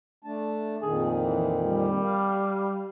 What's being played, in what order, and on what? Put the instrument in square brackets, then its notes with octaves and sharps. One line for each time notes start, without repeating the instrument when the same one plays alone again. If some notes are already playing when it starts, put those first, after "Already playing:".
[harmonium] A3 D4 A5
[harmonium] F2 A#2 D#3 [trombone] G#4
[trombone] E3
G3
[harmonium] F5